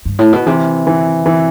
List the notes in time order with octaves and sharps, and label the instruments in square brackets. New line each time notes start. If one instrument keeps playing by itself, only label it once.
[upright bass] G2
A2
B2
[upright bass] C3 [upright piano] E3
[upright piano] E3
E3